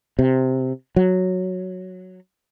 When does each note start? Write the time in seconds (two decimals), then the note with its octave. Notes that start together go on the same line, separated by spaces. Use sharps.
0.19 C3
0.96 F#3